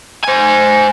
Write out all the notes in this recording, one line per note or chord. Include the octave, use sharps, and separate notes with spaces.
C5 G#5